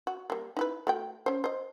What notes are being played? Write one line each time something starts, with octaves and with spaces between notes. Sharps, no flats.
F#4
G3 A#3
D#4 E4 B4
A3 F#4 G5
C#4 C5
C5 D#5